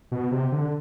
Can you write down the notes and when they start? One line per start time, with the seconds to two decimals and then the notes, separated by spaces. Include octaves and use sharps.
0.12 B2
0.31 C3
0.52 D3